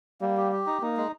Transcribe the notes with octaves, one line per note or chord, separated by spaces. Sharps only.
G3 A#3
G4
G4
D#4
A#3 D#4
G#3